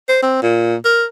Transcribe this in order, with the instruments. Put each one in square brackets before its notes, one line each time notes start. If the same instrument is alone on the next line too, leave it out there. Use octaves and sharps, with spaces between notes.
[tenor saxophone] C5
C4
A#2
A#4